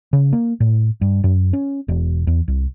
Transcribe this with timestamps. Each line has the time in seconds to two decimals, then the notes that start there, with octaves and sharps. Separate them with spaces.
0.13 C#3
0.33 A#3
0.60 A2
1.01 G2
1.24 F#2
1.53 C#4
1.88 E1
2.27 E2
2.48 C2